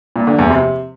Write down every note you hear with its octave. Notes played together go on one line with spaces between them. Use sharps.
A#2
D3
E2
C3